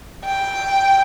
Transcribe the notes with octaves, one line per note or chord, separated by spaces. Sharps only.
G5